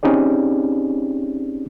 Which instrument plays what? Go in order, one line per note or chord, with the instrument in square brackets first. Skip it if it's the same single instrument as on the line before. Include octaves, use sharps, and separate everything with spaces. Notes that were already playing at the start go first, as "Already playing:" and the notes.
[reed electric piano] C4 C#4 D#4 G4 G#4 D5